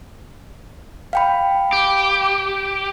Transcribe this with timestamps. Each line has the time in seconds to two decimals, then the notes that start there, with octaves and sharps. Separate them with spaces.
1.13 F5 G5 B5
1.73 G4